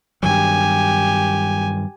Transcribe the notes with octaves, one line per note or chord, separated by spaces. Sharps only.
G2 D#3 F#3 G4 G#5